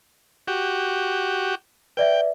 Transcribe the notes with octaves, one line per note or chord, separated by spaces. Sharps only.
F#4 G4
B4 D5 E5 G5